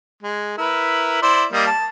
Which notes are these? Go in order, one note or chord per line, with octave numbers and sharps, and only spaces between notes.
G#3
E4 A#4 B4
E4 C5 D5
G3 A#3 D#5
A5